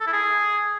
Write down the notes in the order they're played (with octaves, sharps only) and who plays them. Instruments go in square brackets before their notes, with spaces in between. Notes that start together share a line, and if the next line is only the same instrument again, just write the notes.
[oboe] A4
E4
G#4